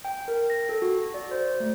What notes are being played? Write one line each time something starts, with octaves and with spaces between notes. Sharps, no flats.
G5
A#4
A#6
A4
F#4
D5
C5
A3